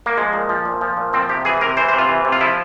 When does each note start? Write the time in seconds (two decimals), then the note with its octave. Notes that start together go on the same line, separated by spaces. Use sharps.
0.06 A#3
0.17 F3 G#3
0.33 A#2
0.49 F3
0.65 A#2
0.81 F3
0.97 A#2
1.13 F3 C4
1.29 C3 G4
1.45 E3 G#4
1.61 C3 A#4
1.77 E3 C5
1.88 C5
1.93 C3
1.98 F4
2.09 E3
2.25 C3
2.32 F4
2.41 F3 E4